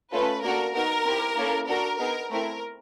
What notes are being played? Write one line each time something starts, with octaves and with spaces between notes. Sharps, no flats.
A3 C#4 F4 A4 B4
A#3 D4 F#4 A4 A#4
B3 D#4 F#4 A#4
C4 E4 G4
A#3 C#4 E4 A4
D4 F#4 A4 A#4
B3 D#4 G#4 A#4
A3 C4 E4 A#4